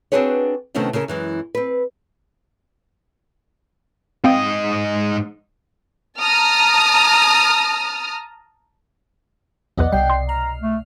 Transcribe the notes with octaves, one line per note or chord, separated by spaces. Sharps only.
C4 D4 F#4 G#4 B4 C#5
C3 D#3 A3 B3 C#4 D4
C#3 C#4 E4 A#4
F#2 E3 G#3
C4 B4
G#2 C4 D#5 F5 G5
A5 A#5 D#6 F6
B1 E2 B4 D5 D#5 F#5
C2 B2 G3 G5 C7
C6
A#5 F6
A3